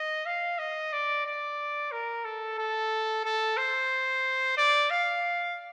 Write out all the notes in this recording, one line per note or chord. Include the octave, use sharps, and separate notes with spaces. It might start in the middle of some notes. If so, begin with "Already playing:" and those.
Already playing: D#5
F5
D#5
D5
D5
A#4
A4
A4
A4
C5
D5
F5